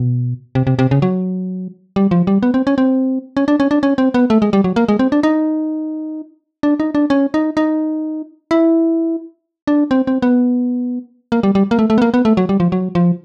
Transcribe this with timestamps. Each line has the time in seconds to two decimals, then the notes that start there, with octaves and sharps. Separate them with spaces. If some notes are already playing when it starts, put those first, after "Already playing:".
Already playing: B2
0.55 C3
0.67 C3
0.79 C3
0.91 C#3
1.02 F#3
1.96 G3
2.11 F3
2.27 G3
2.43 B3
2.54 C4
2.67 C#4
2.78 C4
3.37 C#4
3.48 D4
3.60 C#4
3.71 D4
3.83 C#4
3.98 C4
4.14 B3
4.30 A3
4.42 G#3
4.53 G3
4.64 F#3
4.76 A#3
4.88 G#3
4.99 C4
5.12 D4
5.23 D#4
6.63 D4
6.80 D#4
6.95 D4
7.10 C#4
7.34 D#4
7.57 D#4
8.51 E4
9.67 D4
9.91 C4
10.07 C4
10.22 B3
11.32 A#3
11.43 G3
11.55 G3
11.71 A#3
11.79 A3
11.90 A3
11.98 B3
12.02 A#3
12.14 B3
12.25 A3
12.37 F#3
12.49 G3
12.60 F3
12.72 F#3
12.95 F3